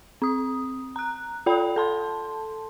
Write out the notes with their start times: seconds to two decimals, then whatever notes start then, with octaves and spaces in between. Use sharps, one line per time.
0.22 C4 D#6
0.96 A#5 F#6
1.46 F4 A4 D5 G5 B5
1.76 A4 A5 C6